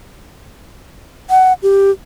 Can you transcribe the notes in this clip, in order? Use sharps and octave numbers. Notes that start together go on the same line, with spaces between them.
F#5
G4